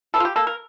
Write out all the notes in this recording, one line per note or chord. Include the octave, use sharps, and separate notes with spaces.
E3 A4
F4
G4
A#3 A4
A#4